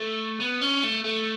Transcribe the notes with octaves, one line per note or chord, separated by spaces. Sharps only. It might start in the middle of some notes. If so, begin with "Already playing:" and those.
Already playing: A3
B3
C#4
A3
A3